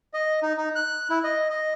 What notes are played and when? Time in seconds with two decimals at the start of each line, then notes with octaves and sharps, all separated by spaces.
0.14 D#5
0.43 D#4
0.57 D#4
0.76 F#6
1.10 E4
1.24 D#5
1.50 D#5